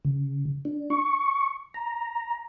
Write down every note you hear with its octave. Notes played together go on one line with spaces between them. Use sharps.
C#3
D4
C#6
A#5